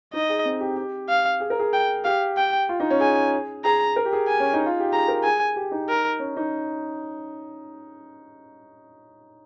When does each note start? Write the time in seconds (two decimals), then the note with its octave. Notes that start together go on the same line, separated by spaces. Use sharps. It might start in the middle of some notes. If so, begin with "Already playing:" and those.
0.13 D#4 D#5
0.29 G#4
0.45 C4
0.60 G4
0.77 G4
1.09 F5
1.40 G#4
1.50 A#4
1.60 G#4
1.73 G5
2.04 G4 F5
2.37 G5
2.69 F4
2.80 D#4
2.90 C#4
3.00 G#4 G#5
3.65 G#4 A#5
3.96 A#4
4.05 G4
4.13 G#4
4.28 G#5
4.40 C#4
4.53 D#4
4.66 F4
4.80 G4
4.93 G#4 A#5
5.08 A#4
5.24 G#4 G#5
5.40 G#4
5.56 G4
5.71 D#4
5.88 A#4
6.19 C#4
6.37 D#4